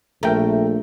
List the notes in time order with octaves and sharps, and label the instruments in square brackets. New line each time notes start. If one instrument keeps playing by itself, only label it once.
[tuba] A#1 [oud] A3 [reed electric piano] A#4 G5 A#5